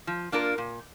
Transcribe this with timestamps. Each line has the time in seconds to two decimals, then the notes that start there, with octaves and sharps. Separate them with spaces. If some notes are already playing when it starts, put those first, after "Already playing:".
0.07 F3
0.32 A#3 D4 F4 A#4
0.58 A#2